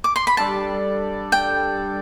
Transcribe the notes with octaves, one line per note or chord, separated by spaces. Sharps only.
D6
C6
B5
G3 D4 A4 D5 A5
G5